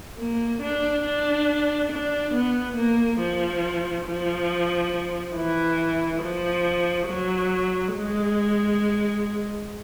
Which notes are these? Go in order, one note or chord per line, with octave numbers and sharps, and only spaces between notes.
A#3
D4
D4
D4
B3
A#3
F3
F3
E3
F3
F#3
G#3